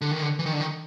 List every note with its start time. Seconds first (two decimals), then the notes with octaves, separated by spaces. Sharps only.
0.01 D3
0.11 D#3
0.22 D3
0.39 E3
0.46 D#3
0.53 D3
0.60 D#3